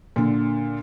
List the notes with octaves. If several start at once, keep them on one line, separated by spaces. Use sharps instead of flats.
A#2 D3